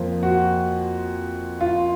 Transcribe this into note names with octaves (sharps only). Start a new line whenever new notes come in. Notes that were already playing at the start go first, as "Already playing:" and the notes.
Already playing: F2 F3 A#3
F#4
F4